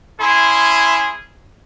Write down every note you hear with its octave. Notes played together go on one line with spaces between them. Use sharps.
C#4 E4 G#4 C6